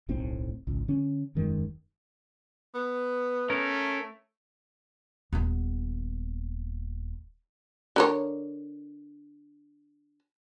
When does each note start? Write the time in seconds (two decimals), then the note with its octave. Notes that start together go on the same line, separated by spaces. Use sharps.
0.09 D1 B1 A2 C4
0.67 G#1 C#2
0.88 D3 C#4
1.35 E1 F#2 D#3 G#3
2.75 B3
3.50 A3 C#4 A#4
5.33 D#1 B3
7.96 D3 A#4 C#5